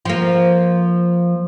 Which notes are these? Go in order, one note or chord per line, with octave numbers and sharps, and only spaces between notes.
F3 A#3